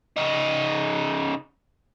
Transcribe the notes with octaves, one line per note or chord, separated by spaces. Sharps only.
C#3 D#4